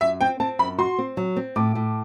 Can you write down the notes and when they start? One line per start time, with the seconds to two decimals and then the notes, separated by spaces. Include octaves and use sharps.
0.01 F#2 E5
0.21 C4 G5
0.40 C4 A5
0.59 F#2 B5
0.78 F#4 C6
0.98 C4
1.17 F#3
1.36 C4
1.56 A2 D6
1.75 A2